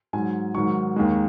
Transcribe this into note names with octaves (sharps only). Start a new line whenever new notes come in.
G#2 F#3 G#5
G#2 D#3 F#3 C#6
D#2 D#3 G#3